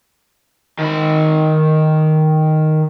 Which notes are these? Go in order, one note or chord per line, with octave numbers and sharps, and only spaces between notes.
D#3 B5